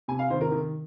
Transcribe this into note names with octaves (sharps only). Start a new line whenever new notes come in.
C3 G#5
F5
D#3 C5
A#4
D#3